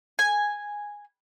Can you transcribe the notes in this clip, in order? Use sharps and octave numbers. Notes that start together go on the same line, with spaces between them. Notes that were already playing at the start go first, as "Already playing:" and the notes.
G#5